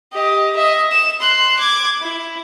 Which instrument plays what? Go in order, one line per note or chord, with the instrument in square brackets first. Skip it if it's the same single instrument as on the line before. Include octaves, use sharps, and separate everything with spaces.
[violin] G4 D#5
D#5 E5
E7
C6 F#6
D6 G#6
E4